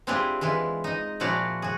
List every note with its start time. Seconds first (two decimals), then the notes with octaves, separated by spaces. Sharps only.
0.07 C4 D4 E4 F4 G4 G#4
0.41 E3 G#3 E4 F4
0.84 D#4 D#5
1.20 A#2 F3 E4 F#4 D5 F5
1.62 F#4 G#4